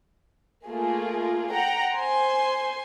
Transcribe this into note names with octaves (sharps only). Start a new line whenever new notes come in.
A3 A#3 F4 G#4
F#5 G5 A#5
C5 G#5 C6